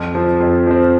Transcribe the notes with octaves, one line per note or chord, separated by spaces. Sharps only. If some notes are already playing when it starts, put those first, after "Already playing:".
Already playing: F2
F3 C4
F2
F3 C4